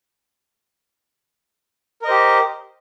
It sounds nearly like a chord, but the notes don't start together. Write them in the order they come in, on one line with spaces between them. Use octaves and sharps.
A#4 D#5 C5 G4